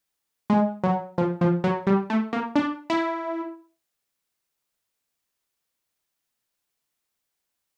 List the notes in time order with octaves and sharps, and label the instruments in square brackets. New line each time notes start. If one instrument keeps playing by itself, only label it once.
[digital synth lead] G#3
F#3
F3
F3
F#3
G3
A3
A#3
D4
E4